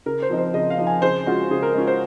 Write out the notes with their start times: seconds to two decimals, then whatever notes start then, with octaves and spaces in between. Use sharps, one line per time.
0.06 C#3 A#4
0.22 C5
0.30 F3 C4 D#4
0.38 C5
0.54 C#3 D#5
0.70 F5
0.78 F3 C4 D#4
0.87 G#5
1.02 C#3 C5
1.26 G#3 C#4 F4 F#4
1.51 C#3 G#4
1.63 A#4
1.75 G#3 C#4 F4
1.87 C5